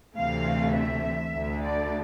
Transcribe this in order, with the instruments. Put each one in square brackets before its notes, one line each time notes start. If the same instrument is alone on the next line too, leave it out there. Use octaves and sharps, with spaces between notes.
[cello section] D2 C3 E3 A3 F5
E5
D2 D3 A3
D5